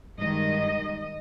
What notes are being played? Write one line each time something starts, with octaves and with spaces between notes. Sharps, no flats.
G2 D#3 G#3 D#5